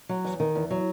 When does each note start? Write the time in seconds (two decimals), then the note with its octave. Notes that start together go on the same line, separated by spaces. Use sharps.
0.09 F#3
0.25 E2
0.40 D#3
0.55 E2
0.70 F#3